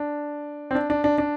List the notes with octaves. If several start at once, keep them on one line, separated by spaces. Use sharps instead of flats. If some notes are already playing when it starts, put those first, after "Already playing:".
Already playing: D4
C4
D4
D4
D4
D4